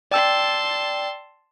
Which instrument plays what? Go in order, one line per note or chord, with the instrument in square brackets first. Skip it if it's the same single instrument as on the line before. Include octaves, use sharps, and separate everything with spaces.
[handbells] D5 G5 E6 [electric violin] A5 C6